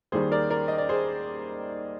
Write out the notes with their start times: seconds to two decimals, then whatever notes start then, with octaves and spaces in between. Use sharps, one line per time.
0.12 D#2 D#3 G3 G#4 C5
0.32 A#4 D5
0.50 A#4 D5
0.68 D#5
0.78 D5
0.89 G#4 C5